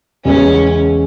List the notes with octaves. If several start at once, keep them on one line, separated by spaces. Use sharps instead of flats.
E2 C#3 G#3 B3 C#4